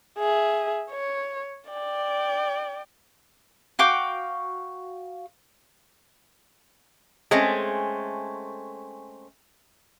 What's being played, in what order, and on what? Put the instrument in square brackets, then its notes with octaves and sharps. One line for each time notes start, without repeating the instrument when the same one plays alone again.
[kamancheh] G#4 E5
C#5
D5 G5
[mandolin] F#4 F5 G5 D6
[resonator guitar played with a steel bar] G#3 A3 C4 C#4